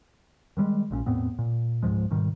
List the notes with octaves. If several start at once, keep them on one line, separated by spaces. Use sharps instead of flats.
D#3 E3 G3 G#3
A#1 A#2 C4 C#4
E2 A2 B3 C4
A#2
C#2 G#2 F3 G#3
G#2 B2 D#3 G3